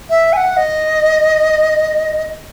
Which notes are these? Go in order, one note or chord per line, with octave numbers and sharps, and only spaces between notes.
E5
G#5
F#5
D#5